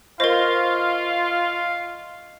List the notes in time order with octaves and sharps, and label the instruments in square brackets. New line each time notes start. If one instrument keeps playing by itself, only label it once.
[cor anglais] F4 [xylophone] A#4 C5 [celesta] D#5 C#6 A#6 [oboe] F5